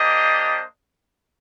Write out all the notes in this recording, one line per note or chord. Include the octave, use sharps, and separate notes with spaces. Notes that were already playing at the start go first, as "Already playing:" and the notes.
Already playing: A#3 D4 G4 C5 D#5